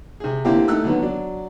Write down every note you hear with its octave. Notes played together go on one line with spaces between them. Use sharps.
C3 G#4
A2 D3 A#3 C4 E4 G4
A3 D#4 E6 F#6
D3 D#3 F#3 B3
F#3 D4